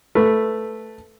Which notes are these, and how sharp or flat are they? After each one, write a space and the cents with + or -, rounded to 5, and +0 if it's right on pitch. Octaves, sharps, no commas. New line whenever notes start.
A3 +0 B4 +0